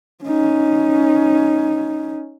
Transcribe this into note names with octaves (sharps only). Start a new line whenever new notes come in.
C#4 D#4